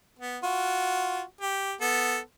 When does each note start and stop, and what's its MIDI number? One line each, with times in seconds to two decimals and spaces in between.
0.19 0.38 59
0.44 1.23 65
0.44 1.23 66
1.41 1.73 67
1.81 2.19 59
1.81 2.19 69